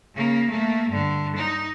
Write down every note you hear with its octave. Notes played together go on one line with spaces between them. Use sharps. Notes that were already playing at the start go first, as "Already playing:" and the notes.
C#3 A#3
A3 A#3
G2 D3
D#4